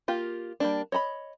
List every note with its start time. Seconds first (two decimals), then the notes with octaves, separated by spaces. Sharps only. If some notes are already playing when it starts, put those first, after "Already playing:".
0.08 A#3 F4 G4
0.60 G3 A#3 D4
0.92 C#5 D#5 A#5 B5